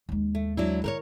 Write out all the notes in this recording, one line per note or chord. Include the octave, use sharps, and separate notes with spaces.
D#2 G#3
A3
F#3 D4 E4
D3 A#4 B4 C#5